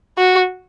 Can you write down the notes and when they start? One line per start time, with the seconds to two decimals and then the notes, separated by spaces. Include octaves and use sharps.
0.18 F#4